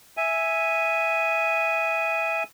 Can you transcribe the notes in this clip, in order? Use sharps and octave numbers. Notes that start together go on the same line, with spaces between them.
E5 G#5